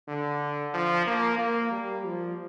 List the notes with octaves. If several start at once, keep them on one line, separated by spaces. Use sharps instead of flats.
D3
F3
A#3
A#3
G3
F3